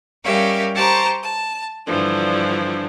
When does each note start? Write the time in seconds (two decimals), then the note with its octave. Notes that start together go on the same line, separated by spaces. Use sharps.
0.23 G3 C#4 G4 A#4 E5 F5
0.75 G4 C5 A5 A#5 C#6
1.22 A5
1.86 G2 D3 E3 F3 D4